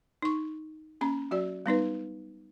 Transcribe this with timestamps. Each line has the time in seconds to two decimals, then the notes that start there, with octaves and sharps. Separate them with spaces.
0.22 D#4 C#6
1.01 A#3 C#4 A#5
1.31 F#3 F#4 D5
1.66 G3 B3 D#4 B4